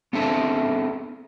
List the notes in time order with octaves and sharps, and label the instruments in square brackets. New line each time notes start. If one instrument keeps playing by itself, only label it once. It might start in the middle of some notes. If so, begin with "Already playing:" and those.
[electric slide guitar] B3 C4 D4 A4 E5 A5